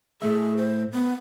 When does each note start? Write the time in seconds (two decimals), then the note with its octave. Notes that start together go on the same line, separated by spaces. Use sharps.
0.22 A2 A3 G#4 E5
0.57 C5
0.92 B3